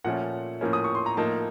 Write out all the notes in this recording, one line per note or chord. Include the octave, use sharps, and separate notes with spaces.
A#2 F3 A3 C#4 F#5
A2 F3 A#3 C#4
D#6
C#6
C6
A#5
A2 F3 A#3 D#4 A5